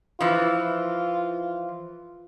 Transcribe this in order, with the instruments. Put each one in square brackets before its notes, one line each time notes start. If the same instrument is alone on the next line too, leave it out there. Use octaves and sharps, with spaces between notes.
[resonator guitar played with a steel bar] E3 F3 [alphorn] F4